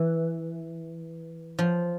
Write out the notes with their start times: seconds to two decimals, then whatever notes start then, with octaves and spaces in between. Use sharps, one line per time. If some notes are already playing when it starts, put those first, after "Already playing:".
Already playing: E3
1.59 F3